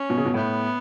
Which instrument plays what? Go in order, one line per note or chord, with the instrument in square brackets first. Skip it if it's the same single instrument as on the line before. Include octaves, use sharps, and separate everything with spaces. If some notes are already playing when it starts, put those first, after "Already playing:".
Already playing: [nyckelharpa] C#4
[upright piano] B2
C#3
B2
[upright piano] A2 [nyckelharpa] B3